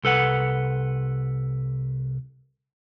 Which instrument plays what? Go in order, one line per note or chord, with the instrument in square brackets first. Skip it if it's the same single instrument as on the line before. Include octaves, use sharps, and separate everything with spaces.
[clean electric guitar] C2 A4 B4 F#5